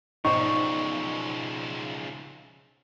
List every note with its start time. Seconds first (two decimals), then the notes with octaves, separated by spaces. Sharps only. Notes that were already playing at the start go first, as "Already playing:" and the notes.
0.25 B1 C#3 F3 D#4 C5 D5 G5 C#6